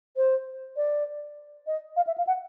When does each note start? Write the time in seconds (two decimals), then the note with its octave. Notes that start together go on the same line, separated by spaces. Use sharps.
0.17 C5
0.77 D5
1.67 D#5
1.97 F5
2.07 E5
2.18 F5
2.27 F#5